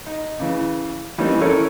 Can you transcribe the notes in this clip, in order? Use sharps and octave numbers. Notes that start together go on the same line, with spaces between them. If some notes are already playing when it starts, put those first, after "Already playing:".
D#4
C#3 E3
E3 G3 A#3 C4 C#4 D#4
E3 C#4 E4 A4 A#4 C#5